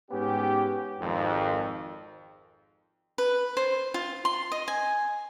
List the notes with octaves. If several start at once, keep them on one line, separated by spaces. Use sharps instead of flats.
G#2 B3 C#4 G4
G#1 F2
B4
C5
F4
C6
D#5
G#5